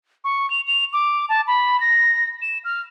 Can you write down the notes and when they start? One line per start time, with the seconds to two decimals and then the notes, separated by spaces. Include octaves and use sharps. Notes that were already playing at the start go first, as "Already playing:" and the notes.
0.24 C#6
0.50 F7
0.67 F7
0.93 D6
1.29 A5
1.47 B5
1.80 A#6
2.42 E7
2.64 F6